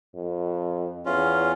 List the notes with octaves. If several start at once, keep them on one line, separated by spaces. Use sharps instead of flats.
F2
E2 C#4 F4